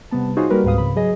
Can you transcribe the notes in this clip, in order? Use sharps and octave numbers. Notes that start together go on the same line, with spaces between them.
C3 G3 B3 A5
D#4 F4 F#4 G#4 C5 C#5
G3 A#3 F#4 A#4 B4
C#2 G#2 C4 B4 F5 D#6
G#2 C#3 B5
F#3 G#4 D#5